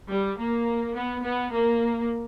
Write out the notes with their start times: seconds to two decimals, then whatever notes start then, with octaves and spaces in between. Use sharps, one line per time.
0.09 G3
0.37 A#3
0.95 B3
1.23 B3
1.51 A#3